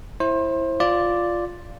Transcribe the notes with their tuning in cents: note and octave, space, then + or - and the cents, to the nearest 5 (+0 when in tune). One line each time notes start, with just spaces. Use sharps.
E4 +0 C5 +30
F4 +0 D5 +0